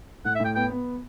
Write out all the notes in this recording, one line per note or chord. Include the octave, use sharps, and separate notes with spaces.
A2 F#5
E5
A2
G5
B3 G5
B3